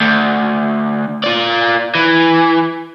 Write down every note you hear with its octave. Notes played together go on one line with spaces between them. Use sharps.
D2
F4 D5
E3